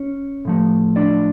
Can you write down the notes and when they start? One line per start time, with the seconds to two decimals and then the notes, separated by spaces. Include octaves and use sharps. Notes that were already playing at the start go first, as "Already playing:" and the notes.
Already playing: C#4 C#5
0.45 A2 F3 A3
0.96 D4 D5